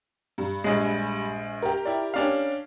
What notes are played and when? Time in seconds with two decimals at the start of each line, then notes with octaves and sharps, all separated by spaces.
0.38 G2
0.64 A#1 G#3
1.62 G4 A#4
1.85 E4 D5
2.14 C#4 D4 F5